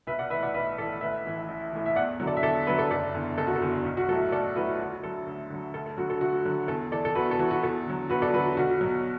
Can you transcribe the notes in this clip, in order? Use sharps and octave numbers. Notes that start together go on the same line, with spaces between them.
B1 B4 E5
D5 F#5
A2 E3 B4 E5
D5 F#5
B1 B4 E5
A2 E3 A4 D5
A1 B4 E5
A2 E3
A1
A2 E3
E5
E2 D5 F#5
D3 F#3
A4 D5
E5
E2 A4 D5
D3 F#3 B4 E5
A4 D5
F#1 A4 D5
E2 D3
F#1 A4
F#4
A4
E2 D3
B1
F#4
A2 F#3 A4
B1 A4 D5
A2 F#3 F#4 B4
D2 F#4
D3 F#3 A4
D2
D3 F#3
D2 A4
A4
D3 F#3 F#4
A4
D2 F#4
D3 F#3
E2 A4
E3 A4 D5
A4
E2 F#4 B4
A4
E3 F#4
F#4
E2 A4
D3 F#3
E2 F#4 B4
A4 D5
D3 F#3 F#4 B4
B1 F#4
B2 F#3